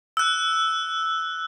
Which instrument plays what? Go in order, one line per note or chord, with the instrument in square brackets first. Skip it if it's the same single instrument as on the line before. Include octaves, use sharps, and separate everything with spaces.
[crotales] E6 F#6